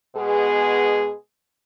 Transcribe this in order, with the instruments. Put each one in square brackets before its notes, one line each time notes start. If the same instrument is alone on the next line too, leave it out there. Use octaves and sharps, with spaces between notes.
[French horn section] B2 G#3 B3 G#4